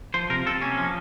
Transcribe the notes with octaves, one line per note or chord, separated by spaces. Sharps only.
F3 C5
C3 A#4
C3 A4
A#3 C#4
F3